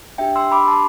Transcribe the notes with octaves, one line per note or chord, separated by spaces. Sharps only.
D4 G4 E5 G5
C6 E6
B5 D6
A5 C6